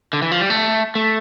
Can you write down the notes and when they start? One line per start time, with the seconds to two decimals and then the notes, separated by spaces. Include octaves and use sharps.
0.13 D3
0.22 E3
0.31 F3
0.41 G3
0.50 A3
0.95 A3